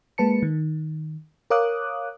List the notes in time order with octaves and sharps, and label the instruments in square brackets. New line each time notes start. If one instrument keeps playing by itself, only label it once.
[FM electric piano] G#3 A#3 B4 A5 C#7
D#3
A#4 C#5 F5 D6 D#6 F#6